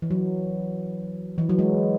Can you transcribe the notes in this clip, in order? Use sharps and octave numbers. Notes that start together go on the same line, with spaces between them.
E3
F#3
E3
F#3
G#3